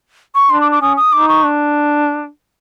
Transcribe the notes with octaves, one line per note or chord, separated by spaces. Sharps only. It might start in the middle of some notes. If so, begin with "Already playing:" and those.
C#6
D4 C6
D6
D6
C#4 D#6
D#6
D#4 D6
C#6
D4